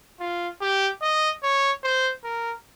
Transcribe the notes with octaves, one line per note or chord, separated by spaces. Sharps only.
F4
G4
D#5
C#5
C5
A#4